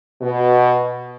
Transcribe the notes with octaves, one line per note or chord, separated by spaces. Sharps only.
B2